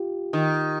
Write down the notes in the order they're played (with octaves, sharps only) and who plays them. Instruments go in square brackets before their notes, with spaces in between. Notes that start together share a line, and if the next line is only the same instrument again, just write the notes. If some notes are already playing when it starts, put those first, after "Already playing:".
Already playing: [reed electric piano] F4 G4
[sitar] D#3